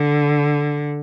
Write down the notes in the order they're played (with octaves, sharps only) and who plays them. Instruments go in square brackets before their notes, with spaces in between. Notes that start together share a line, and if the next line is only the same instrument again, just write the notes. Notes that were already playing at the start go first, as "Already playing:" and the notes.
Already playing: [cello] D3